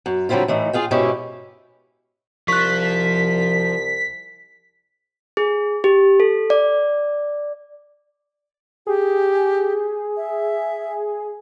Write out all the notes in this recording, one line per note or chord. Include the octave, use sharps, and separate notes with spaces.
F#2
D3 F#3 G3 C4 E4 F4
A2 E3 D#4
F4 G#4 F5 G5
G#2 B2 C#4 E4 G4
C2 F3 C#6 F#6 B6
G#4
G4
A4
D5
G4 G#4
E5